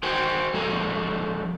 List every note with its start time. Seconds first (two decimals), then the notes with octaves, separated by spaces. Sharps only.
0.03 F#4 A#4 C5 G5 G#5
0.54 F3 G#3 C#4 A4 A#4